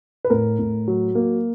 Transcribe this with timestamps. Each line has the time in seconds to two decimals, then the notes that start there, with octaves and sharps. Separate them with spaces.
0.25 B4
0.30 A2 A#4
0.59 A2
0.88 F#3
1.15 A#3